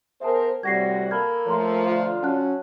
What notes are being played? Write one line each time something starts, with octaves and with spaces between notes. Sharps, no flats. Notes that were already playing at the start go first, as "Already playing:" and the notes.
B3 G#4 A#4 C5 E5 A5
A2 C3 G3 F#4 G#6 A#6 C7
A#3 A4 B5 F6 G#6
F3 A3 C#5 A#5 C6
D3 F4
F#3 C#4 F#5 A5 F#6